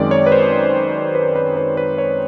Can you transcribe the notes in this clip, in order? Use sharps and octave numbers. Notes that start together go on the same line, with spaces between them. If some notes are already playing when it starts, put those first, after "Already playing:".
Already playing: F#2 D#3 G#3 C4 D5
C#5
B4
C5
B4
B4
B4
B4
C#5